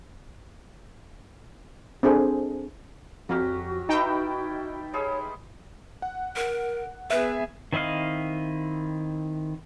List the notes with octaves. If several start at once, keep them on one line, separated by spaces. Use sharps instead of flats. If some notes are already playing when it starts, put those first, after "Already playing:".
C4 D4 G#4 A4 C5
F2 F#3 C#4 F#4 G4
D#4 E4 B4 G5 A5
G3 G#3 G#4 C#5
F#5
A#4
B3 G#4 B4 E5
D#3 C4 E4 D#5 F5